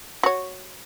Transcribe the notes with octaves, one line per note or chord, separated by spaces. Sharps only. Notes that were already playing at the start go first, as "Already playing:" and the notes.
F#4 C#5